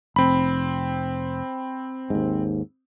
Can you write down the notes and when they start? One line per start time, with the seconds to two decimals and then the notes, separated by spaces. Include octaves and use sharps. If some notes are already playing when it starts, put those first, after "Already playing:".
0.16 F1 C4 B5
2.10 D#2 G#2